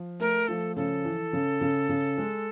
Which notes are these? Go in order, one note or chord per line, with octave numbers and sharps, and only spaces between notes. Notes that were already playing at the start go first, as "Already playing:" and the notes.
Already playing: F3
A3 A#4
F3 A4
C#3 A4
E3
C#3
C#3
C#3
G#3